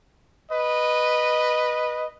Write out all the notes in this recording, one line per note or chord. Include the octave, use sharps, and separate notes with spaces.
B4 D#5